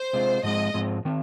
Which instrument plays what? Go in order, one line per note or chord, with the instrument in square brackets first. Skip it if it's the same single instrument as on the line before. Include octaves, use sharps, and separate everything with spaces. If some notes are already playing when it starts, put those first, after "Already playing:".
Already playing: [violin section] C5
[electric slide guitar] C3 G#3 C4 F4
[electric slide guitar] G#2 F3 G#3 C4 [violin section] D#5
[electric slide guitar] G#2 F3 G#3 C4
D#3 C4